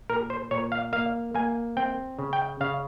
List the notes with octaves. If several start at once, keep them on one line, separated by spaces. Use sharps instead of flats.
A#2 A#4
C5
A#2 C#5
F5
A#3 F5
A#3 G#5
C4 G5
C#3
G5
C#3 F5